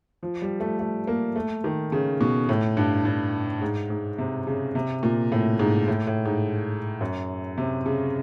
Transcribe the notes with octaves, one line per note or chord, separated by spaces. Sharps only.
F3
G3
A3
A3
A#3
A3
D#3
C#3
B2
A2
G2
G2
G#2
G#2
C3
C#3
C3
A#2
A2
G#2
A2
A2
G#2
F#2
C3
C#3